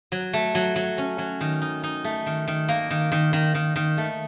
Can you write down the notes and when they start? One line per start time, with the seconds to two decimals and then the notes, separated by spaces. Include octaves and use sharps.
0.12 F#3
0.33 A3
0.55 F#3
0.76 F#3
0.98 C#4
1.18 F#3
1.41 D#3
1.62 D#4
1.84 D#4
2.04 A3
2.26 D#3
2.48 D#3
2.69 A#3
2.91 D#3
3.12 D#3
3.33 D#3
3.55 D#3
3.76 D#3
3.98 A3